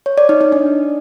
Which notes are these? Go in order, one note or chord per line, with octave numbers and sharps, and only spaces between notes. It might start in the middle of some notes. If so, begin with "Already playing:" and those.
C#5
D5
D#4
D#4
D4